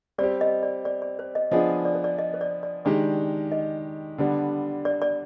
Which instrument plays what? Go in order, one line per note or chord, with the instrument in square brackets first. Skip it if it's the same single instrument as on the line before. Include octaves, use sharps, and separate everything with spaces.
[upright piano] G3 C4 G4 [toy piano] D5
[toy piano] D#5
D5
D5
D5
C5
D#5
[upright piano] F3 B3 D4 G#4 [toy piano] D#5
[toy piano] D5
C5
D5
D#5
C5
D5
D5
[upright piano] D#3 G#3 D4 G4 [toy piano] D5
[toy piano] D#5
[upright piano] D3 G3 B3 D4
[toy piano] D5
D5